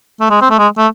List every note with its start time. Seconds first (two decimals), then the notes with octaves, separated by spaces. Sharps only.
0.20 A3
0.30 G#3
0.41 C4
0.50 A3
0.58 G#3
0.78 A3